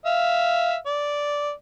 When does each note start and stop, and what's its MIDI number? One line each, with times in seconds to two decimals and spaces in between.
0.06 0.76 76
0.06 0.76 77
0.86 1.51 74